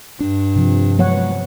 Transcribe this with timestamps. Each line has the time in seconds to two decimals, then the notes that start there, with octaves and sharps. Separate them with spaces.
0.20 G2 D4
0.56 C3 F3
0.99 F3 F#3 G#3 B3 C#5 F#5